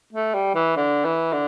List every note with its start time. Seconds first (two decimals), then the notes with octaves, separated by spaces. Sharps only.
0.13 A3
0.34 G3
0.55 E3
0.76 D3
1.05 E3
1.33 D3